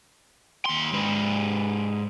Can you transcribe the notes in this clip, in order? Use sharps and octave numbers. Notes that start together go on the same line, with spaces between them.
D#2 C6
G#2 B4